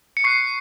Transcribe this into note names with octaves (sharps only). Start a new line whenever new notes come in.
C#7
C#6 F#6 C7